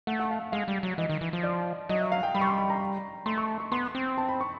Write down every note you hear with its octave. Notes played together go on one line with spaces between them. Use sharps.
A3 F#5
F#5
F5
G#3 F5
G3
F#3
E3 D#5
D#3
E3
F3
D5
F#3 D#5
E5
F5
G5
G3 B5
C#6
C6
B5
A#5
A3 C6
C#6
C#6
B3 C6
C4
A5
B5
C#6